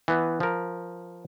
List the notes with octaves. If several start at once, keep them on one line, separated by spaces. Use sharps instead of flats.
E3 B3
F3 A#4